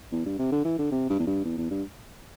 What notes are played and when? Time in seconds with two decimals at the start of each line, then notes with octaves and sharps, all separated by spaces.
0.12 E2
0.26 G2
0.39 C3
0.52 D3
0.65 E3
0.79 D3
0.92 C3
1.10 G2
1.19 E2
1.27 G2
1.44 E2
1.58 E2
1.71 G2